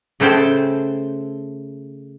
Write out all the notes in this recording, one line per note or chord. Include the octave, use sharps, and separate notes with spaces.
C#3 A3 C5 G5 A5